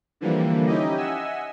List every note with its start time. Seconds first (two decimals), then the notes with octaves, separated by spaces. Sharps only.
0.21 D3 E3 F3 G3 A#3
0.66 C#4 D#4 E4 G4 D#5
0.97 D#5 E5 F#5 G#5 E6